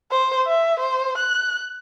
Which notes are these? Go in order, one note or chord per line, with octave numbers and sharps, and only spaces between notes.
C5
E5
C5
F#6